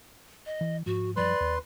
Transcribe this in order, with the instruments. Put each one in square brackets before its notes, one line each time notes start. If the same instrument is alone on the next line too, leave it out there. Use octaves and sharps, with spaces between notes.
[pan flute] D#5
[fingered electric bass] E3
[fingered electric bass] G#2 F3 [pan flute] F#4
[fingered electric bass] F#2 F3 G3 [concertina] B4 C6 [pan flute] D5
[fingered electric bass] D#2